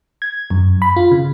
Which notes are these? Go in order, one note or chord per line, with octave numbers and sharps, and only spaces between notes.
G#6
F#2
B5
F4
C#3